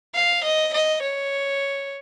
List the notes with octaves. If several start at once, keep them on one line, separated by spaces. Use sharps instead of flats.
F5
D#5
D#5
C#5